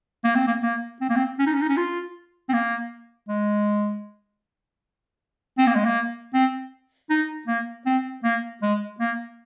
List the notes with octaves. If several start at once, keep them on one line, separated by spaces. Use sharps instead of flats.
A#3
C4
A#3
A#3
C4
A#3
C4
C#4
D#4
C#4
D#4
C#4
F4
C4
A#3
G#3
C4
A#3
G#3
A#3
C4
D#4
A#3
C4
A#3
G#3
A#3